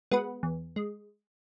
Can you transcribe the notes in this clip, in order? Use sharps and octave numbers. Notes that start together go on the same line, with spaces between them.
G#3 B3 F#4 B4
E2
G#3